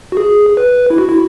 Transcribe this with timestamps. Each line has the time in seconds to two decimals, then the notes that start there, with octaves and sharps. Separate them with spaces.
0.12 F#4
0.17 G#4
0.57 B4
0.90 E4
0.98 F#4
1.09 E4